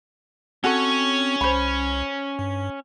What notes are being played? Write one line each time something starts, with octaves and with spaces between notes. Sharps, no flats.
C4 C#4 F#4 A4 C#5
C2 C5 B5
G2